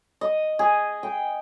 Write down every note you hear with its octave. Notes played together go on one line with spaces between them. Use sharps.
D#5
G#4
G5